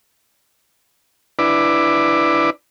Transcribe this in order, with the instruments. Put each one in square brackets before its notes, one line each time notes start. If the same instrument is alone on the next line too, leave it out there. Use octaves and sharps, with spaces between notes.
[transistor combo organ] D4 E4 B4 D5